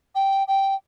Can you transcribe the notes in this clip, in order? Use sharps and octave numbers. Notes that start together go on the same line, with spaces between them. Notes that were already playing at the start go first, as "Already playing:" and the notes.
G5
G5